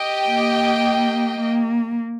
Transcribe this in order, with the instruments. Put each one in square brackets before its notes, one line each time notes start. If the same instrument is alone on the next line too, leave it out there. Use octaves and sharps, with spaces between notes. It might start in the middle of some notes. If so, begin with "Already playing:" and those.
Already playing: [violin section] G4 D#5 G5
[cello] A#3
A#3